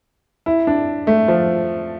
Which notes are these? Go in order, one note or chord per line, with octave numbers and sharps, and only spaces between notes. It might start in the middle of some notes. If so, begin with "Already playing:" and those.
E4
D4
A3
F3